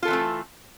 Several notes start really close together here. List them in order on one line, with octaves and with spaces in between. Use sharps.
F4 A4 E3 C4 A3